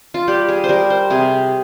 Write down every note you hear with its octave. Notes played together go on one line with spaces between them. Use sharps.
F4
G3 G4
G#4
C5
G3 A#4
C5
C3 G#4